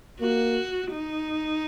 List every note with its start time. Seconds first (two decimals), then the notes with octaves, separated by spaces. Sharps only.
0.21 A#3 F#4
0.91 D#4